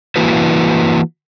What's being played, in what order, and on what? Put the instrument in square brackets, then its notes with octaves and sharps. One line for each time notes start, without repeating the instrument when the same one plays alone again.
[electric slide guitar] E3 A#3 E4 F#4 B4